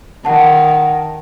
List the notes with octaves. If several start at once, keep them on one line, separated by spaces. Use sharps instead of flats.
D#3 F#5 A5